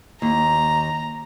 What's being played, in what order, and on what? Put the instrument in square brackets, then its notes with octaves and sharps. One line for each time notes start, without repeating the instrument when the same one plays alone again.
[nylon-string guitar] D#2 [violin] A#5